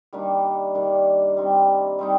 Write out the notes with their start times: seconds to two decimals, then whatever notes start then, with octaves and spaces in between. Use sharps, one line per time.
0.13 D#3 G3 A#3 D4
0.75 D#3 G3 A#3 D4
1.37 G3 C4 D#4
1.99 G3 C4 D#4